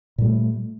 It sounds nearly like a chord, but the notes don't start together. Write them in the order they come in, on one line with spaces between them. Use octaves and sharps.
A#2 G3 A3